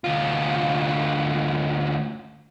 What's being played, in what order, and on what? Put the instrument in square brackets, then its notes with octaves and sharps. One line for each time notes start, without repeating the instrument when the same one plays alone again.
[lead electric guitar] D2 F4